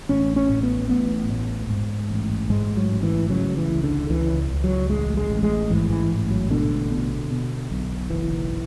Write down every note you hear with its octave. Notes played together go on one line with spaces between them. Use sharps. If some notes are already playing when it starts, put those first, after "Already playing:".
A1 C#4
C#4
A2
B3
A1 B3
A2
G#2
A1
G#2 G#3
F#3
A1
E3
C#3 F#3
E3
C#2
D3
C#2 E3
C#2
F#3
A1 G#3
G#3
A1
G#3
G#2 E3
E3
A1
F#3
B2 D3
B2
B2
B1
F#1 E3